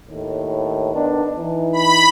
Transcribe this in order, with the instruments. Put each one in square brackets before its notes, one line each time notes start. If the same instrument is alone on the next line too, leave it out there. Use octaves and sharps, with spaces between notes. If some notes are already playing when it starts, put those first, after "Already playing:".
[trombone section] D#2 A2
D#3 B3 D4
E3 D#4
[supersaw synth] B5